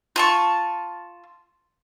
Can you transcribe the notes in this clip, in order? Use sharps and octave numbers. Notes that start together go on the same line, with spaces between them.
F4 A5 C#6